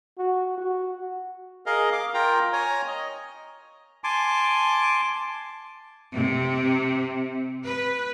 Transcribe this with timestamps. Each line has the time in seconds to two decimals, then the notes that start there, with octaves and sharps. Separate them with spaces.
0.18 F#4
0.58 F#4
1.66 G#4 A#4 D#5 F5
1.92 F5 D6
2.14 F4 A#4 G5 A#5
2.53 C#5 G#5 A#5
2.87 D#5
4.04 G#5 A5 C6 D6
6.14 C3
7.63 B4